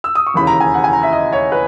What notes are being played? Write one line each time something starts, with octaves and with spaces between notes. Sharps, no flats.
E6
D#6
C#6
E1 D#2 C#3 E3 B5
A#5
G#5
F#5
G#5
A#5
E5
D#5
C#5
B4